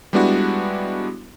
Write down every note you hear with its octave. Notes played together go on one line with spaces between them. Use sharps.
G3 G#3 B3 D4 E4 F#4